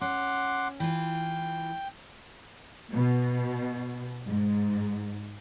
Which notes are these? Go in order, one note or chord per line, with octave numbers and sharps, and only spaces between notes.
C#4 F#5 C6 D6
E3 F4 G5
B2
G#2